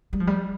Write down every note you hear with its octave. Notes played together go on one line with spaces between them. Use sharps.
G3
F3
G3